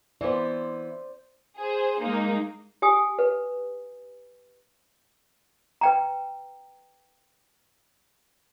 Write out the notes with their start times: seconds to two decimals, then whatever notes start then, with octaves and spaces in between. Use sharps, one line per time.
0.21 E3 B3 C5 D5
1.57 G#4 C5
2.01 G#3 A#3 D#4
2.82 G4 G#5 D#6
3.19 B4
5.81 B4 G5 A#5